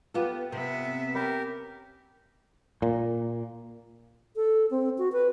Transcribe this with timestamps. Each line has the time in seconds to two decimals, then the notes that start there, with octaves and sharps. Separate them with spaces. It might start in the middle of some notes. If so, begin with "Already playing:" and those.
0.14 B3 F4 G4 A4 B4
0.52 C3 B3 E5
1.15 C#4 G4 A#4 B5
2.82 A#2
4.36 A4
4.71 C4
4.98 F#4
5.13 B4